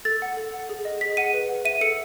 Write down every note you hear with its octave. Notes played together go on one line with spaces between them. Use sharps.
A4 A6
F#5
A4
F#5
G#4
D#5
G#4 B6
F#5 D#7
B4
F#5
E5 D#7
A4 C#7